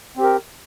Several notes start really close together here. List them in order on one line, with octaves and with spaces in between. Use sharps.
C4 G4 A#4